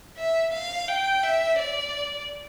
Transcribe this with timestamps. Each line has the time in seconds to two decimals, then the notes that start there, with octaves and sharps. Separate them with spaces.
0.18 E5
0.53 F5
0.88 G5
1.23 E5
1.59 D5